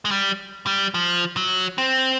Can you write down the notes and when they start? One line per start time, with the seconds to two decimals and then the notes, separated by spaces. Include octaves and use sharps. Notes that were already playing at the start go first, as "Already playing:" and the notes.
0.05 G#3
0.11 G3
0.67 G3
0.94 F3
1.37 F#3
1.78 C4